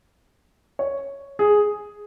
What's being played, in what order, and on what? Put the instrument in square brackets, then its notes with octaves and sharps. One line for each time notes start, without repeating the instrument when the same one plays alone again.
[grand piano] C#5
G#4